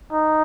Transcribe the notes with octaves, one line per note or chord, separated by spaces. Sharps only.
D#4